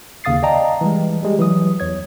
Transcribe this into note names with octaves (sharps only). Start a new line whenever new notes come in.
D#2 C#3 F5 D#6 A6 C7
D5 D#5 F5 G5 A5 A#5
E3 G3 G#3
G3 G#3 G4
E3 F#3 D#6
E2 C#5 G#6